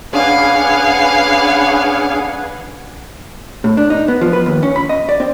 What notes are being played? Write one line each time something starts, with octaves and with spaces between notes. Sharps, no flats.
C#4 D4 G#4 B4 F5 F#5 G#5
A2
D4
D#4
B3
F3
B4
D#2
C#4
B5
D#5
D5
C4